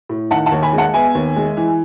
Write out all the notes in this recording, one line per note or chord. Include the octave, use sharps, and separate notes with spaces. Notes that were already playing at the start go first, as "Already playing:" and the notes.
A2
D#3 F#5 A5
F#5 A5
D#2
G#5 B5
G#3
F#5 A5
B3 E5 G#5
D#2
G#3
E3